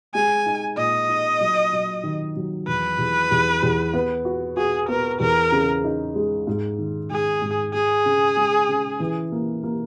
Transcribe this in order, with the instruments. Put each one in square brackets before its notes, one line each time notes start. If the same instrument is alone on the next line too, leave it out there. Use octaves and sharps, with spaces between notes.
[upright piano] G#3 [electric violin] G#5
[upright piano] D#4
[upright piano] A#2 [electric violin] D#5
[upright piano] D#4
F#3
F#3
D#3
F#3
[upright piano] E2 [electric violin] B4
[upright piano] E2
E2
E2
B3
F#4
[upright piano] F#4 [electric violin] G#4
[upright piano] B3 [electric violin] A#4
[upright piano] E2 [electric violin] A#4
[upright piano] C#3
D#4
G#3
G#2
D#3
[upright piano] G#2 [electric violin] G#4
[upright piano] G#2
[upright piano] G#3 [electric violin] G#4
[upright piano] C#3
G#3
C#3
E3
A#3
A#3